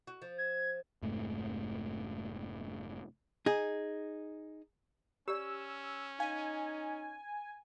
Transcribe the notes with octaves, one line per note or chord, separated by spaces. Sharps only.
F#4
F3
G#6
F1 G#2 A3
D#4 G#4
C#4 G4 D5 E6
D#4 F5 G#5